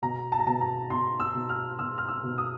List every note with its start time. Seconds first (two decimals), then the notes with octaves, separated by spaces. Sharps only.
0.02 B2 A#5
0.32 A5
0.39 A#5
0.46 B2 A5
0.61 A#5
0.90 B2 C6
1.20 E6
1.34 B2
1.49 F6
1.79 B2 E6
1.98 F6
2.08 E6
2.23 B2
2.38 D#6